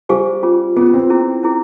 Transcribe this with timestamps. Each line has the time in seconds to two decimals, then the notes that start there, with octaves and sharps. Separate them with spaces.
0.09 G3 G#4 C5 F5 G#5 C#6
0.43 C#4 F4 G#4
0.77 B3 C#4 F4 G#4
0.94 C4
1.10 C#4 E4 G#4
1.43 C#4 E4 G#4